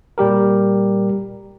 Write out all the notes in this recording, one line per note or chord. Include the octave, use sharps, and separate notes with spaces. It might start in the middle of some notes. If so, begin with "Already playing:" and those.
A#2 G3 G4 A#4